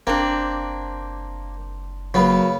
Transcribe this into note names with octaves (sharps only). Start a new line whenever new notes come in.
F#1 A#3 C4 D4
C#3 F#3 A#3 B3